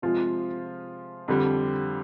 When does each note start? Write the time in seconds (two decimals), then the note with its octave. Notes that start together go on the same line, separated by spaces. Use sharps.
0.02 C3 F3 G#3 F4
1.28 F2 D3 G3